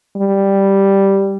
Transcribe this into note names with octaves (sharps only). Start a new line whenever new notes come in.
G3